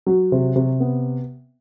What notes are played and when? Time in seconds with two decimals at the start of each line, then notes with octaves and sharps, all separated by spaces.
0.06 F#3
0.32 C3
0.56 C3
0.80 B3